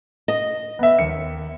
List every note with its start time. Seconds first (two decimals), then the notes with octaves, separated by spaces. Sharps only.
0.28 D#5
0.79 B3 E5
0.99 D#2 C#7